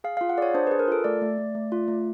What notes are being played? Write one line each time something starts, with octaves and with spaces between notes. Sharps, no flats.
G#4 F5
F4 F5
F#5
G#4 C#5 D5
D4 C5
G#4 B4
A#4
F4 A4
A3 D5
A3
A3
A3
F4
A3